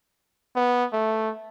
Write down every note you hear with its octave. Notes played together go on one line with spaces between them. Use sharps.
B3
A3